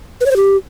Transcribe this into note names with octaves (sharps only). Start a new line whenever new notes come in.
B4
C#5
C5
G4